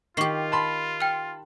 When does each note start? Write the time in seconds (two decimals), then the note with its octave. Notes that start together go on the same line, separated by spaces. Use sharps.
0.17 D#3 F4 G4 C#6 C7
0.52 A5 B5 C6
1.00 G5 F6